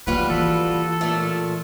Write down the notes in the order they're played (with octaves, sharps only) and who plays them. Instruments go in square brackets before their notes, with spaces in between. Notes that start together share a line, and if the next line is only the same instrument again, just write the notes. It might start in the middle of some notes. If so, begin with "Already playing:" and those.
[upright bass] F3 A#3 [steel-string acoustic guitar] G3 F4 F#4 [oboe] B4
[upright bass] E3 [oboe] A4
[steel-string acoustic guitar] A#2 A3